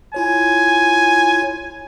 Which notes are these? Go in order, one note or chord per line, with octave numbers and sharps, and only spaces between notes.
E4 F4 C#5 G#5